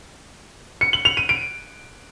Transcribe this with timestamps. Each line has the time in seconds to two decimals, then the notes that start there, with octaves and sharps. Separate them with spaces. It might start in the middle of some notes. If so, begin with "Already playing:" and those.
0.81 C#7
0.93 F#7
1.05 F7
1.17 D#7
1.29 D7